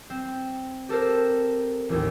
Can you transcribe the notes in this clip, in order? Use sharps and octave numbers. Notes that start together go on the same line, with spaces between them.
C4
G4 A4 A#4 C5
A1 D#2